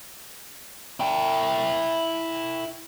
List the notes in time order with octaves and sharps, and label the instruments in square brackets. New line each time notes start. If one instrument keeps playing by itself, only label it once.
[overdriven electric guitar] E4 G5